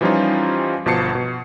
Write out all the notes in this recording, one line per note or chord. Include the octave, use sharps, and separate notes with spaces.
E3 F3 G3 C#4 D#4 F4
G1 B2 F3 A5 C7 C#7
B2